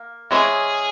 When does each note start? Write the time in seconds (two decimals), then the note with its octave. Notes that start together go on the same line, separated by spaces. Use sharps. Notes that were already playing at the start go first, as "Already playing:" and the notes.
Already playing: A#3
0.31 E3 G#3 C#4 G#4